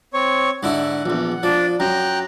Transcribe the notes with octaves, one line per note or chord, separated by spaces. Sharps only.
C4 C#5 C#6
G#2 D3 E4 F#5
A#1 E2
F3 D4 D5
F#2 G5 A#5 F#6